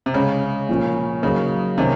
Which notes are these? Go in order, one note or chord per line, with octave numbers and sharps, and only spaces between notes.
C3
C#3 G#3 C#4 G#4
A#2 F3 A#3 C#4
C#3 F#3 A#3 D#4 G#4
C3 D#3 A#3 C#4